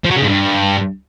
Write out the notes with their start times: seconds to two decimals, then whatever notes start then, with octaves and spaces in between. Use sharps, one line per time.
0.05 F3
0.11 F#3
0.17 C#3
0.23 G#2
0.29 G2